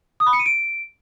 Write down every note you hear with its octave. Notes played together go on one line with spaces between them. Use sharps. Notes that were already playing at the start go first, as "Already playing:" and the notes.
D#6
B5
C#7
D#7
D7